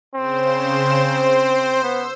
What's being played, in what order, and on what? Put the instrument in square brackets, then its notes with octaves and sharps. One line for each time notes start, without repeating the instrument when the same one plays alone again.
[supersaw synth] C#3 C5 E7 [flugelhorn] C4
[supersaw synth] C5
[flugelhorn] B3 [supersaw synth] E6